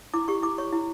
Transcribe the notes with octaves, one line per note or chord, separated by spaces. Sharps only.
E4 D6
G4 C#6
E4 D6
C#5 C#6
E4